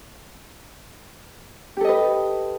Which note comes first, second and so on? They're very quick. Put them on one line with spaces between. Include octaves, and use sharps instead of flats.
G4 A4 D#5 B4